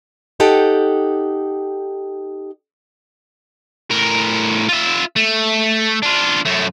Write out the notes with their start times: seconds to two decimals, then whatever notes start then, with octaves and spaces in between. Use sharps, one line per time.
0.40 D#4 G4 A4 F#5 G5
3.91 A2 A#4
4.68 F4 E5
5.16 A3
6.03 D4 F4
6.45 F#2 A3